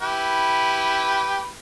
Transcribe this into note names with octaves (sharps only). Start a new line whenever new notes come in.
E4 G4 B4